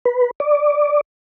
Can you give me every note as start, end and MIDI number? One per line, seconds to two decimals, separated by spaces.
0.05 0.31 71
0.40 1.01 74